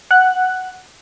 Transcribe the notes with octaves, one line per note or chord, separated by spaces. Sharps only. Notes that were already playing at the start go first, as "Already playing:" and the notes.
F#5 F#6